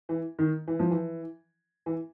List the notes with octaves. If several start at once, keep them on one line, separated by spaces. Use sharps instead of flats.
E3
D#3
E3
F3
E3
E3